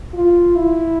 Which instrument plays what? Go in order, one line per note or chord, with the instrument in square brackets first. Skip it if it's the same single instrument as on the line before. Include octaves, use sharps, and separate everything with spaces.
[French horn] F4
E4